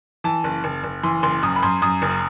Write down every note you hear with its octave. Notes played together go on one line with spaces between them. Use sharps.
E3 A5
F#1
F#1
F#1
E3 C6
F#1 C6
F#2 D#6
B5
F#2 C6
F#2 D#6
F#1